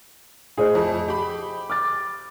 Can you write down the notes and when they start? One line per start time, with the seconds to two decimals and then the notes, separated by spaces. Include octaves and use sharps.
0.58 A2 G#4 C5 D#5
0.75 F2 A3
1.08 G4 B5
1.70 D6 F6 A6